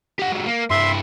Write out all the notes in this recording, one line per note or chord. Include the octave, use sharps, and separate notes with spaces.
G4 F#5
F#3 G#3
A#3
G2 E4 E5 C6